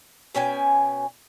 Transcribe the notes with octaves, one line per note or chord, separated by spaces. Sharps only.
B2 C#4 G5 G#5